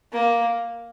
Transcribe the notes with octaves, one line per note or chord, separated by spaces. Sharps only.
A#3